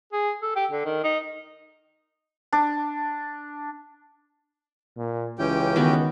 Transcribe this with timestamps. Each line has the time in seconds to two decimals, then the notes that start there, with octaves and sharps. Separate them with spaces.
0.13 G#4
0.42 A4
0.56 G4
0.71 D3
0.85 D#3
1.04 D#4
2.52 D4
4.97 A#2
5.39 C#2 E3 C#4 G4 G5
5.76 D#3 B3 F#4